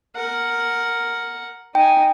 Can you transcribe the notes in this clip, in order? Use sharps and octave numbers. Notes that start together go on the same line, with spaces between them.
A#4 F#5
D#4 G5 G#5